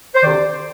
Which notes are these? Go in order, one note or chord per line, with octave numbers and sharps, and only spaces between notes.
C5
D2 C3 D#3 D5